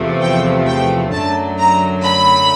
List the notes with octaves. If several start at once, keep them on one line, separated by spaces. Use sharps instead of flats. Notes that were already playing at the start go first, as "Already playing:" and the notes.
Already playing: E2 C3 F3 A3
G5
G5
F#2 D3 F#3 A3 A5
A#5
B5